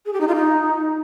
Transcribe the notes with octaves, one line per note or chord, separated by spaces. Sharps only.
G#4
G4
D#4
F4
D#4